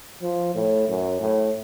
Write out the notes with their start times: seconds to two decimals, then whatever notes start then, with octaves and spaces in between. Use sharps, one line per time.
0.22 F3
0.55 A2
0.88 F#2
1.20 A2